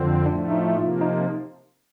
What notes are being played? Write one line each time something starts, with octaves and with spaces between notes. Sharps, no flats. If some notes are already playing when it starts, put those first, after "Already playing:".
Already playing: F2 D3 C4 F4
A2 F3 A3 D4
D#4
C3 F3 A#3 F4
D#4